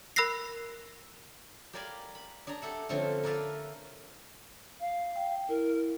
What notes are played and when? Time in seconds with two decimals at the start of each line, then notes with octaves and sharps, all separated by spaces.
0.16 A#4 B5 E6 F#6 A#6 C7
1.73 G4 A#4 D5 F5 G#5 B5
2.15 B5
2.47 D4 G#4 D5 A#5
2.62 G4 A4 E5 F#5
2.89 D3 F3 A3 C4 C#4
3.23 A#4 B4 D5 E5 F5 A5
4.80 F5
5.16 G5
5.49 E4 A#4